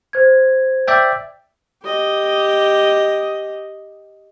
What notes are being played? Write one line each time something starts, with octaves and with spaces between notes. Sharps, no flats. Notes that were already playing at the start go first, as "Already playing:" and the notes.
C5 G#6
D5 E5 G5
G4 D#5